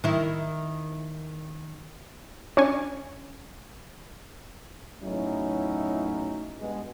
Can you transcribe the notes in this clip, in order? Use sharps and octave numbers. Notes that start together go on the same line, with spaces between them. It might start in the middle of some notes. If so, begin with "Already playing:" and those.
D#3 E4
C#4 D4 C#5 G#5
E2 A2 F#3 C#4 D#4 E4
G2 B2 G#3